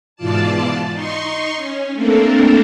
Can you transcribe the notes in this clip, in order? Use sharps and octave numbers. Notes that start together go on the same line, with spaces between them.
G#2 B2 E3 F4 D5 A5
D#4 C6 C#6
C#4
A3 A#3 C4 D4 A4 A#4